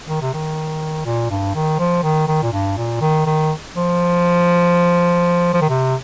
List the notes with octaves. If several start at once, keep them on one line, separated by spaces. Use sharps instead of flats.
D#3
C3
D#3
A#2
G2
D#3
F3
D#3
D#3
A#2
G2
A#2
D#3
D#3
F3
F3
D#3
C3